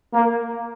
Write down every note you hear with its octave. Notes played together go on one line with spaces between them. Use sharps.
A#3